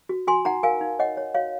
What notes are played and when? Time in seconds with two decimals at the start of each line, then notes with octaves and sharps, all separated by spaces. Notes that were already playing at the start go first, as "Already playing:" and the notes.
0.09 F#4
0.27 F#4 G#5 C6
0.45 D#4 F#5 A#5
0.63 A#4 F5 G#5
0.81 D#4
0.99 C#5 D#5 F#5
1.17 C#5
1.35 F#4 C#5 F5